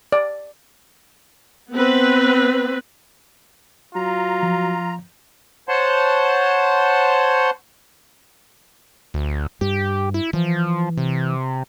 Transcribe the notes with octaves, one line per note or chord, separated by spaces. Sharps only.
D5
B3 C4 B4
F#3 F4 A#5
F3
C5 C#5 F#5 A5 C6
D2
G2 G4
E4
E3 F3
C3